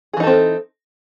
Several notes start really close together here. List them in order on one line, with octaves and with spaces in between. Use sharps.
G#4 E3 D#4 A4 C4